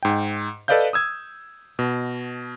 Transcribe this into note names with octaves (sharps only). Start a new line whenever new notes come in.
G#2 G5
A4 B4 D5 D#5 F5 G6
D#6 E6 G#6
B2